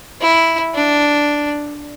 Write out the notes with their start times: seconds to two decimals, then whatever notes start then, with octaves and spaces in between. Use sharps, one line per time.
0.21 E4
0.75 D4